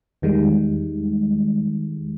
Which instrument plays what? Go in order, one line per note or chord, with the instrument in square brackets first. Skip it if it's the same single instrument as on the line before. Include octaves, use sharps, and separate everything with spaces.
[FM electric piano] E2 D#3 G3 G#3